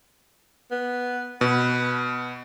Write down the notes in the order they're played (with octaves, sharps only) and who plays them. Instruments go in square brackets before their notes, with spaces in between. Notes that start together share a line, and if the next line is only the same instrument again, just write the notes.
[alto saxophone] B3
[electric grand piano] B2 [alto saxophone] B4